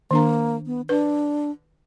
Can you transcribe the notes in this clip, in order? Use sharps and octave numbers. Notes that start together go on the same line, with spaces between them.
D#3 A#3 D4 A#5
B3
D4 B4